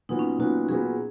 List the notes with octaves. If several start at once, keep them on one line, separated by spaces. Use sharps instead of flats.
A#2 F#3 B3 D#4
C#4
D#4
A#2 F#3 B3 F#4
A#2 F#3 B3 G#4